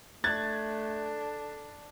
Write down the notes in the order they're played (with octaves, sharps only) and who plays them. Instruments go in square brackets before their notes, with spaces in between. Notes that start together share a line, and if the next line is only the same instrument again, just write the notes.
[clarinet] A3 [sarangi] D4 [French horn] A4 [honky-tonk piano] F#6 G#6 A6